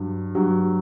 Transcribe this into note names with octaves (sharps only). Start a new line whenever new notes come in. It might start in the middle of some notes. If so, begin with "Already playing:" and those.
Already playing: G2 F#3
G2 F#3